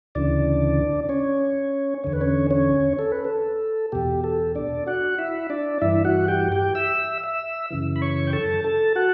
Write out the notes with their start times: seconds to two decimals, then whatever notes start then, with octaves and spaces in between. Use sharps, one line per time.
0.15 D2 C#3 E3 D4 D5
1.09 C#4 C#5
2.04 E2 D3 C#5
2.13 B4
2.21 C#4 C#5
2.51 C#4 C#5
2.99 A4
3.12 B4
3.24 A4
3.92 E2 B2 G4
4.24 A4
4.55 D4 D5
4.86 F#4 F#5
5.18 E4 E5
5.50 D4 D5
5.81 G2 E3 E4 E5
6.05 F#4 F#5
6.28 G4 G5
6.52 G4 G5
6.75 E5 E6
7.23 E5 E6
7.71 F#2 C#3 E3
7.96 B5
8.02 C#5 C#6
8.27 G5
8.33 A4 A5
8.64 A4 A5
8.95 F#4 F#5